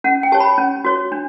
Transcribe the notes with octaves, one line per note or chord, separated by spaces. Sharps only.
C#4 F#5
G5
G4 C#5 A5
B5
C#4
F#4 C#5
D4